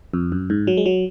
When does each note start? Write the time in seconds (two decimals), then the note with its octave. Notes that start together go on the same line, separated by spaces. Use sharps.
0.13 F2
0.32 F#2
0.50 G#2
0.67 F#3
0.77 G#3
0.86 F#3